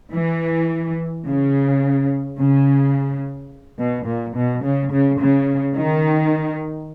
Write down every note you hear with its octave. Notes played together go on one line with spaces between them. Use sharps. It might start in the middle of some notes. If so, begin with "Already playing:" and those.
E3
C#3
C#3
B2
A#2
B2
C#3
C#3
C#3
D#3